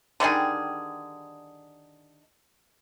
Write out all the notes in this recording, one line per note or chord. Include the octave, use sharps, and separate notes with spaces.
D3 D#3 G3 G#4